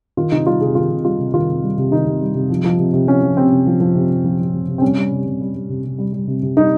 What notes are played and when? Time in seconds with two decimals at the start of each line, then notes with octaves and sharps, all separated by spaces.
0.17 D#3 F4
0.32 C3 D#4
0.46 G3 F4
0.61 C3 G#4
0.75 D#3 F4
0.90 C3
1.05 G3 F4
1.19 C3
1.34 D#3 F4
1.49 C3
1.62 G3
1.78 C3
1.91 D#3 D#4
2.06 C3
2.21 G3
2.35 C3
2.50 F3
2.64 F3
2.79 C3
2.93 C3
3.07 F3 C#4
3.22 F3
3.37 C3 C4
3.52 C3
3.66 F3
3.80 F3
3.95 C3
4.10 C3
4.24 F3
4.39 F3
4.53 C3
4.68 C3
4.78 C4
4.82 G3 C#4
4.97 G3
5.11 C3
5.26 C3
5.41 G3
5.55 G3
5.69 C3
5.84 C3
5.98 G3
6.13 G3
6.27 C3
6.42 C3
6.57 G3 D#4